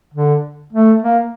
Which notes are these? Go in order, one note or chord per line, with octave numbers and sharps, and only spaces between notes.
D3
A3
A#3